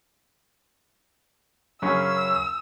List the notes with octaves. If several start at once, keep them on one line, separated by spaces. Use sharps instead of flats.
F#2 C#3 C#4 E6